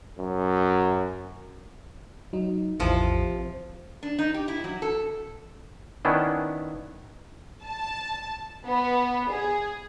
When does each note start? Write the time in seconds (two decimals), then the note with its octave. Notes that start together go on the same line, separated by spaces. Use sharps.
0.19 F#2
2.33 F#3 D#4
2.80 A1 E2 C3 E3 F3
4.03 D4
4.19 D#4
4.34 G4
4.48 E4
4.64 F#3
4.82 A4
6.05 D#3 B3 C#4 D4 E4
7.64 A5
8.66 B3
9.30 G#4